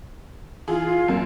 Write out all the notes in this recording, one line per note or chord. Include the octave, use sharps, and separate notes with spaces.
E3 F4 G#4
F#2 A#3